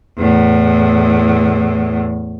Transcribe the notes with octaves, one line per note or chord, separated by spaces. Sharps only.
E2 A2